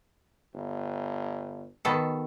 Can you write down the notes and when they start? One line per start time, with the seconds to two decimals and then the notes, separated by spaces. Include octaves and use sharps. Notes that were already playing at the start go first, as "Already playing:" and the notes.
0.54 G1
1.85 B2 D#3 A4